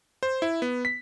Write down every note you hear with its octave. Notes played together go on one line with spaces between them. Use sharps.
C5
E4
B3
B6